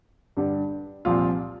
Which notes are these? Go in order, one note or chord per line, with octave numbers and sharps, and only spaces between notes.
G2 D3 G3
C2 A#2 F3 F4